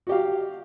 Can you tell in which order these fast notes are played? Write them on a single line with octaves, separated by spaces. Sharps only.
F#4 G4 F5